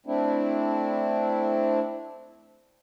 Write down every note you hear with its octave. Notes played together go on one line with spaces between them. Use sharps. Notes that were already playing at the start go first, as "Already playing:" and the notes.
A3 C4 D4 E4